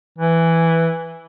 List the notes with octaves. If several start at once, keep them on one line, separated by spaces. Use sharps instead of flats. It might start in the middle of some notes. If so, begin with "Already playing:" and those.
E3